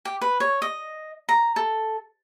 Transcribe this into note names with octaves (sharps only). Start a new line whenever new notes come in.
G4
B4
C#5
D#5
A#5
A4